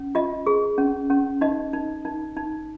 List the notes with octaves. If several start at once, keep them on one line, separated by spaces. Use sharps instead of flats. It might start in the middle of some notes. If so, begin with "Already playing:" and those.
Already playing: C#4
F4 D#5
G#4
C#4
C#4
D#4 D#5
D#4
D#4
D#4